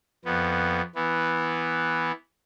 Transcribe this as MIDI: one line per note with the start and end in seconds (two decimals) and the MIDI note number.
0.25 0.82 41
0.25 0.82 59
0.95 2.12 52
0.95 2.12 59